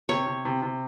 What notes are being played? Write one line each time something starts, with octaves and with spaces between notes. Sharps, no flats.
C3 C#5
C3
C3
C3